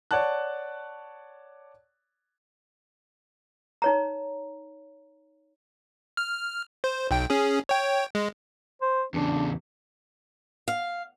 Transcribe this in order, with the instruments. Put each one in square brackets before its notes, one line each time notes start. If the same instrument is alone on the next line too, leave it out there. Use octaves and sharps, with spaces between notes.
[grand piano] C#5 D5 F#5 A5 F#6
[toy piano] D#4 C#5 A#5
[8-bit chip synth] F6
C5
B1 G5
C#4 G#4
C#5 G5
G#3
[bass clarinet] C5
[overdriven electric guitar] E2 C#3 [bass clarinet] D4
[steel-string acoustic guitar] F5